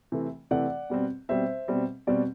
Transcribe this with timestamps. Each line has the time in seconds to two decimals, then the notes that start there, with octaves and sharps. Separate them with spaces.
0.12 C3 E3 A3
0.51 C3 E3 A3 D5 F#5
0.90 B2 G3 C4
1.29 B2 G3 C4 C5 E5
1.68 B2 G3 C4
2.07 B2 G3 C4 D5